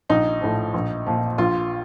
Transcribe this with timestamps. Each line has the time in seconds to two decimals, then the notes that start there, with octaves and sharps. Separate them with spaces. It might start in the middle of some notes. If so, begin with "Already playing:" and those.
0.09 A#1 D#4
0.41 A2 F3
0.74 A#1
1.06 A#2 F3
1.38 A#1 F4